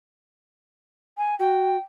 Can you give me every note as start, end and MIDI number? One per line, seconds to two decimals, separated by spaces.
1.18 1.38 80
1.39 1.77 66
1.39 1.78 79